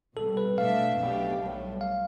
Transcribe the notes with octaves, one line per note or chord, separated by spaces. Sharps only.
C2 B2 G3 A4
B4
B2 A3 D4 A4 E5 F5
B1 B2 A3 D4 G4
B1 A2 G3
F5